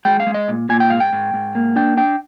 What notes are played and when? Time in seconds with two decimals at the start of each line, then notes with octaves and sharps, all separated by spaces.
0.05 G#3 G5
0.20 F5
0.27 G#3
0.34 D#5
0.48 A#2
0.69 A#2 G#5
0.80 G5
0.90 G#2 F5
1.00 G5
1.13 G#2
1.34 G#2
1.55 A#3
1.76 D4 G5
1.97 D4 G5